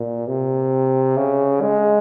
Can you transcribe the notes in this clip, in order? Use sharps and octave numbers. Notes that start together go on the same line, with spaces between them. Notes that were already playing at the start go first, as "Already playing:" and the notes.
Already playing: A#2
C3
C#3
G#3